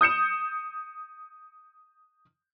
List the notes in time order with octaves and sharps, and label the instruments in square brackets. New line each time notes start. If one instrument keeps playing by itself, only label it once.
[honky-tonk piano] D#6 G6 C#7 E7